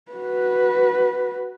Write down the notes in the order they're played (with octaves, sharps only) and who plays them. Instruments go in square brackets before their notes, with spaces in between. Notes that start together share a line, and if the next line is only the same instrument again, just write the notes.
[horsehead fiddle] F#4 B4